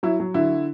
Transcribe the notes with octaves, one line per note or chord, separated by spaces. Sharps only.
F#3 E4
F#3
D3 E4